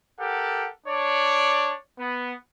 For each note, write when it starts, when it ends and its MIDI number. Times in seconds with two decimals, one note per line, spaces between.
0.19 0.67 67
0.19 0.67 69
0.19 0.67 70
0.19 0.67 78
0.86 1.73 62
0.86 1.73 73
0.86 1.73 74
1.99 2.33 59